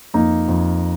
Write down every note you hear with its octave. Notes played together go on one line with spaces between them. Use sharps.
F2 A#3 D#4
F2